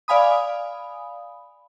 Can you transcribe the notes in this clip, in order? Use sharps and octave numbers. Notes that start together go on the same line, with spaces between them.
D5 F5 G#5 B5 D#6